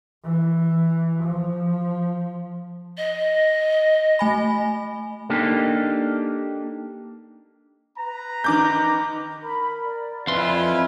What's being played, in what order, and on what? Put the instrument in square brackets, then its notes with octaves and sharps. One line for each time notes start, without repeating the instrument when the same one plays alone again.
[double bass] E3
F3
[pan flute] D#5
[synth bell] A3 G#5 B5
[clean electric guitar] A#3 D4 D#4 G4 A4
[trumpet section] B4 A#5
[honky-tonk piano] D#3 D6 G6
[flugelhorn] A#4 [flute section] B5
[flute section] D5
[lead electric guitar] F2 C6 [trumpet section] E4 F4 G#5 [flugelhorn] B4